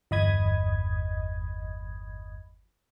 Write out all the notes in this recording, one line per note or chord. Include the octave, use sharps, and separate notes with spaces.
G1 E2 D#5 B5 D#6 G#6